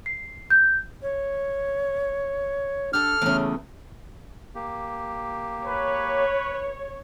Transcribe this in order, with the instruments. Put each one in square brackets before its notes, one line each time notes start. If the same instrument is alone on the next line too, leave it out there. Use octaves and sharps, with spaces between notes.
[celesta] C7
G6
[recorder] C#5
[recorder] D4 [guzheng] G4 A4 [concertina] F6
[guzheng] E2 C#3 [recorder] A3
[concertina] A#3 G4
[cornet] B4 [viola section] C#5